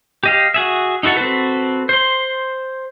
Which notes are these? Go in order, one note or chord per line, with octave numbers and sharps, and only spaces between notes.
G4 D#5 F5
F#4 G#4 E5
D#4 E4 F#4 A4 F#5
C4 F#4 A4 B4
C5 C6